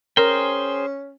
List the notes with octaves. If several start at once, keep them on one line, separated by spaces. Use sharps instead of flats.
C#4 G#4 A#4 C5 G5